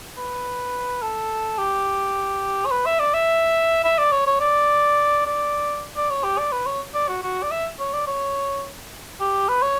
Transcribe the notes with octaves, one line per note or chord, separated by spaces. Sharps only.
B4
A4
G4
C#5
B4
E5
D5
E5
E5
D5
C#5
C#5
D5
D5
D5
C#5
G4
D5
B4
C#5
D5
F#4
F#4
D5
E5
C#5
D5
C#5
G4
B4
C#5